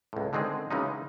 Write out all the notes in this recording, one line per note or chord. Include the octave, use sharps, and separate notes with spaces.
C#2 A2
D3 D#3 G#3 C4 G#4
C#3 E3 F#3 G#3 C#4 D#4